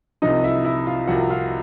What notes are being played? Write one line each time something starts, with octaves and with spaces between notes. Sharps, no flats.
C2 C3 F3 D#4 D#5
E4 E5
E4 E5
F4 F5
C2 C3 F3 F#4 F#5
F4 F5